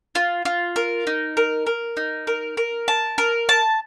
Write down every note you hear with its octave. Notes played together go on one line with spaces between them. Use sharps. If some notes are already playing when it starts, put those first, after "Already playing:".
F4
F4
A#4
D#4
A#4
A#4
D#4
A#4
A#4
A5
A#4
A5